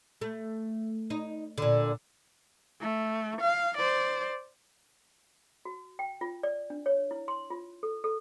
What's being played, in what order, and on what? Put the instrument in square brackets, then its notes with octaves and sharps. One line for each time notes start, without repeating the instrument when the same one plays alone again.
[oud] A3
D#4
A#2 D3
[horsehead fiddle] A3
F5
C5 D5
[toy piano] F#4
G5
F4
D5
D4
C#5
E4
C6
F4
A4
A4